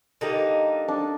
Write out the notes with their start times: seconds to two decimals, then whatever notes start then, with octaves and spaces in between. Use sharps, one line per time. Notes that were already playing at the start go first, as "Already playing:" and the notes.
0.21 D3 G3 A#3 D#4
0.88 D4